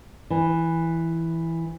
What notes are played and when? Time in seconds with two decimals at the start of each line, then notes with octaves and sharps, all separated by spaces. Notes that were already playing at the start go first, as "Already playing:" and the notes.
0.30 E3